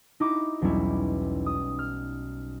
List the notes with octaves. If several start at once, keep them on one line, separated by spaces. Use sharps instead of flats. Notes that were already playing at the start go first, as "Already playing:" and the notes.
D#4 E4 F#4 D6
B1 E2 G3 C#4 E4
D#6
F6